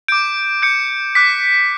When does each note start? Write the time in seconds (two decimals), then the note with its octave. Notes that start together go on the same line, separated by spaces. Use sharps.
0.08 D6 G6 D7
0.62 D6 G6 C#7
1.15 D6 F#6 B6